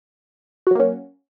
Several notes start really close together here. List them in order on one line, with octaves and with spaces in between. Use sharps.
F#4 F#3 A#3 C#4